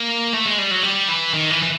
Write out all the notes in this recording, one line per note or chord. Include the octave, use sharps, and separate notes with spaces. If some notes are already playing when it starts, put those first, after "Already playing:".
Already playing: A#3
A3
G#3
G3
F#3
G3
E3
D#3
E3
E3